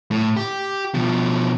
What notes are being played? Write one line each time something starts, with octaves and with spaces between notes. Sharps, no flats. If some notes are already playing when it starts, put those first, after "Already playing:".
A2
G4
B2 F3